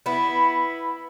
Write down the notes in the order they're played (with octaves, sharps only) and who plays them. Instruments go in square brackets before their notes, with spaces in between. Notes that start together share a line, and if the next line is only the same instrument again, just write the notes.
[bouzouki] B3 E4 [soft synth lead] B5